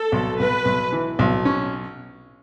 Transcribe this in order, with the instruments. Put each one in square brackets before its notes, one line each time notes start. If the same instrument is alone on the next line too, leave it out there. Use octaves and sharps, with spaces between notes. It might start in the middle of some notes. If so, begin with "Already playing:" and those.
Already playing: [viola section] A4
[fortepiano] B1
[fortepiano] B1 [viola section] B4
[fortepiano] B1
E3
B1
C#4